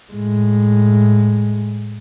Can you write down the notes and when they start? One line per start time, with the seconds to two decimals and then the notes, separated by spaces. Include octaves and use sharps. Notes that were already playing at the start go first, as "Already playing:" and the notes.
0.13 A2 G#3